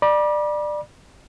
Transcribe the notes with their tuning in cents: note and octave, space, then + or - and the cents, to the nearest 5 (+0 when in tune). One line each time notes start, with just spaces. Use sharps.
D5 +20 B5 -40